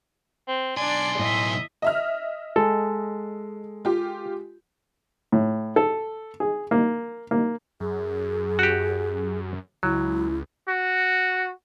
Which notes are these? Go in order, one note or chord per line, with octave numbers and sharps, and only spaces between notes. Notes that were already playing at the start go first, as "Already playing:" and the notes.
C4
B1 D4 D5 G#5 C6
A2 D#5 E5
D#5 E5 F6
G#3 A4
F4 G4
A2
A4
G#4
A#3
A#3
F#2 G#4
F#4 G4
C#2 F#3 E4
F#4